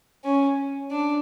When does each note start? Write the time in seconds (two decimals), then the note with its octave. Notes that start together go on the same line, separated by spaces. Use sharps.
0.25 C#4
0.91 D4